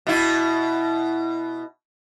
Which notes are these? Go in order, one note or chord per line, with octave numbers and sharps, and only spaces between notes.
B2 E4